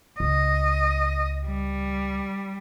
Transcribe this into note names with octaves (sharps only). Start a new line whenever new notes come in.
C#2 D#5
G3